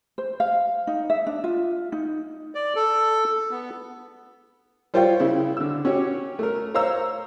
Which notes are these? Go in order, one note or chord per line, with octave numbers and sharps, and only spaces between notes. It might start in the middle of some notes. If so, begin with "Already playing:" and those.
C5
F5
D#4
E5
D4
F4
D#4
D5
A4
B3
G3 F4 C5 C#5 F5 G5
C#3 E4
D3 E6
C#4 F#4 G4 C#5
A3 A#4
C5 C#5 F5 A#5 E6